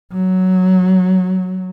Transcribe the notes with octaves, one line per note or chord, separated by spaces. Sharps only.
F#3